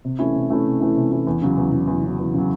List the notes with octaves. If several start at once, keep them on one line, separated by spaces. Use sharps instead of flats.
C3
E3 A3 C#4 E4
C3
E3 A3 C#4 E4
C3
E3 A3 C#4 E4
C3
E3 A3 C#4 E4
E2
C#3 F#3
E2
C#3 F#3
E2
C#3 F#3
E2
C#3 F#3